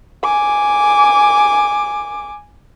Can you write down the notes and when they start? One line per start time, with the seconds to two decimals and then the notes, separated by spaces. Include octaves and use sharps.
0.24 G#5 D6